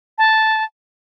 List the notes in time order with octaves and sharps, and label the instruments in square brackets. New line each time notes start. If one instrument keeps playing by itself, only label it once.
[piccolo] A5